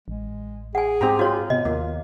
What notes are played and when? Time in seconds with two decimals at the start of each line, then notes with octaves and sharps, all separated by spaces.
0.08 A1 G#3
0.75 G#4 F#5 G#5
1.01 G#2 C4 G4 A#5
1.19 F4 F#4 C#5
1.50 C3 B3 D#5
1.65 D#2 A#3 F4